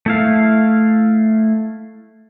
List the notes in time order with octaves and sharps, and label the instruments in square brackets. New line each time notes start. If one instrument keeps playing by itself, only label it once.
[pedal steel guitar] A3 E4 F5